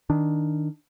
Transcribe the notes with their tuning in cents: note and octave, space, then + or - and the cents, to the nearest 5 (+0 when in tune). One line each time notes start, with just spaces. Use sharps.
D#3 +0 D4 +0